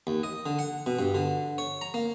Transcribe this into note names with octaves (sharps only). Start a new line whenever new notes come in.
D#2
D#5
D3
F#5
B2
G2
D3
C#5
A#5
A#3